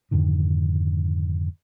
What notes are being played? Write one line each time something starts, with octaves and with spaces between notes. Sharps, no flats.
F2 G#2 D3 D#3